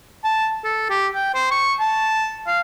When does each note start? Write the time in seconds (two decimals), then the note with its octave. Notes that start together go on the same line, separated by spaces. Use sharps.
0.24 A5
0.64 A4
0.89 G4
1.14 G5
1.34 C5
1.51 C#6
1.80 A5
2.47 F5